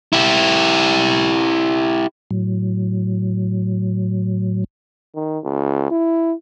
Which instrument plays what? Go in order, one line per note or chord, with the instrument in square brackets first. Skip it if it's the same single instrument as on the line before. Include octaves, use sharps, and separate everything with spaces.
[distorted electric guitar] E4 G4
[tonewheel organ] A2 F#3
[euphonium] D#3
C#2
E4